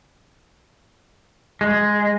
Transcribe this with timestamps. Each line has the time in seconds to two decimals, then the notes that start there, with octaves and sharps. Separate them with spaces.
1.61 G#3